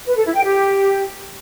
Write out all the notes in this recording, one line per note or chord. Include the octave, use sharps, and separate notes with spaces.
B4
A4
E4
G5
G4